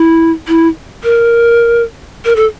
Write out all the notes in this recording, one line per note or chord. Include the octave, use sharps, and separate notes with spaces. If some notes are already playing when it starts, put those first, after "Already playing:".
Already playing: E4
E4
A#4
A#4
A4